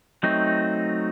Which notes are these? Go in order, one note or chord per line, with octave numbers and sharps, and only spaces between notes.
F#3 A3 C4 D#4